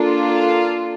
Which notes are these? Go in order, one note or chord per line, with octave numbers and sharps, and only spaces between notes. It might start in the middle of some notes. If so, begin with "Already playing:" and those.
Already playing: A#3 D4 F4 A4
F5